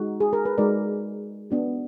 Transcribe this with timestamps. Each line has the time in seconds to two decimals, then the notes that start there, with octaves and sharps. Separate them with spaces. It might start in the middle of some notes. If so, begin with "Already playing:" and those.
Already playing: G#3 D#4 F#4
0.20 G#4
0.33 A#4
0.45 B4
0.58 G#3 D#4 F#4 A#4 D5
1.51 B3 D4 F#4